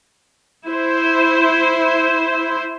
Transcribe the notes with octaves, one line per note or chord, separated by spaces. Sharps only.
E4 C5